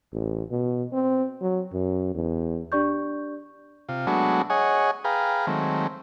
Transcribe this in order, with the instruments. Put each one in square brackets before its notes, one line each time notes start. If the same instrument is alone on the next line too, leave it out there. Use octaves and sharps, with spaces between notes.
[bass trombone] A1
B2
C4
F#3
F#2
E2
[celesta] D4 G4 D5 C#6 G6
[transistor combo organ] C3 F4
F#3 G#3 A3 B3 D4 F#4
G#4 C#5 D#5 F#5 G#5
G#4 B4 F5 G5 A#5
D#3 F#3 G#3 A3 C4